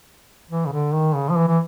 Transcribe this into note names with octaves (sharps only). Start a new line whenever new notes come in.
E3
C#3
D3
D#3
C#3
F3
E3
E3